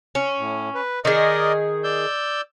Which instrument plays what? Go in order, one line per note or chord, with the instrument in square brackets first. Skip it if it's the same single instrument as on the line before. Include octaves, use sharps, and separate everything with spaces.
[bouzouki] C#4
[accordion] A2
B4
[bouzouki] D#3 G#4 [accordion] A#4 D5 D#5
[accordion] D5 E6 G6